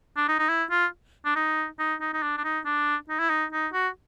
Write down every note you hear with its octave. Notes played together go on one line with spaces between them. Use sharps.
D4
D#4
D#4
E4
F4
D4
D#4
D#4
D#4
D#4
D4
D4
D#4
D4
D#4
E4
D#4
D#4
F#4